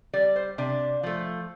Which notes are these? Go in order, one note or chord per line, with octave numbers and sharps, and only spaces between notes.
G3 D5
C5
C3 D4
F3 A3